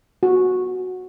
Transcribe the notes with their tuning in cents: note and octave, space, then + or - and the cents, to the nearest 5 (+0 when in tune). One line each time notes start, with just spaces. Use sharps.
F#4 -10